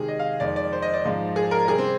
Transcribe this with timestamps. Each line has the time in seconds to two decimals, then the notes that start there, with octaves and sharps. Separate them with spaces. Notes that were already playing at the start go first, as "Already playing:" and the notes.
Already playing: C3 D#3 G#3 G#4
0.08 D#5
0.19 F5
0.40 F2 D#3 G#3 D5
0.56 D5
0.73 C5
0.82 D#5
0.94 D5
1.05 G#2 F3 G#3
1.36 G#4
1.51 A#4
1.68 C3 G3 G#4
1.78 C4